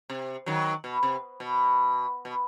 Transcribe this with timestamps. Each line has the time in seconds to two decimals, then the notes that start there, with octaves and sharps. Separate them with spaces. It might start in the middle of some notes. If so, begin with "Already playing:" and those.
0.10 C3
0.46 D#3 F#3
0.84 B2
1.03 C3
1.40 B2
2.25 B2